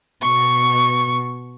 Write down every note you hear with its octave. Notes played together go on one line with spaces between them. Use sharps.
B2 C#6